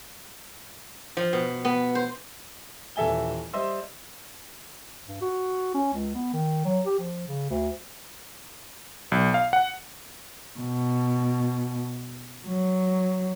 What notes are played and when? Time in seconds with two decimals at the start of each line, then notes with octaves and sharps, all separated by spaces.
1.17 F3
1.33 B2
1.65 B3
1.95 C5
2.96 D#1 E3 A4 E5 G#5 G7
3.53 G3 C5 D#5 E5 C6 E6
5.07 G2
5.22 F#4
5.75 C#4
5.93 C#2
6.15 B3
6.33 D#3
6.65 F#3
6.86 G4
6.99 F3
7.28 C#3
7.50 D2
9.12 B1
9.34 F5
9.53 F#5
10.59 B2
12.45 F#3